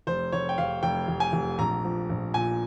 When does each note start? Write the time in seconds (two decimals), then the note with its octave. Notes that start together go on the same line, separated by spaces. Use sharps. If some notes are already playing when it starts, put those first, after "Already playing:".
0.07 F1 C5
0.32 F1 C#5
0.49 G5
0.58 F1 F5
0.83 F1 G5
1.08 F1
1.20 G#5
1.33 F1
1.59 A#1 A#5
1.84 F3
2.10 A#1
2.34 A#2 G#5